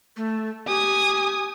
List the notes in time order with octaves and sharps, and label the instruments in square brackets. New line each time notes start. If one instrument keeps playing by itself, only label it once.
[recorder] A3
[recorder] G4 [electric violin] G#5 D#6